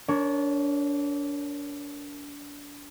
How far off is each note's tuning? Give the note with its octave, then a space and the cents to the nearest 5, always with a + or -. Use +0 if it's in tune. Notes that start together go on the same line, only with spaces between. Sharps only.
D4 -30 A#4 +0 C#5 +0